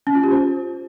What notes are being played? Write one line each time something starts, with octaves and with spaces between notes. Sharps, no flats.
C#4
F4
G4
C5